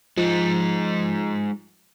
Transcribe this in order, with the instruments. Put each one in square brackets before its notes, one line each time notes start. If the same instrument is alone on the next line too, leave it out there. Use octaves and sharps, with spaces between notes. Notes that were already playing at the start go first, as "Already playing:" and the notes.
[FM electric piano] F3 [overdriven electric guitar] G#3 D#4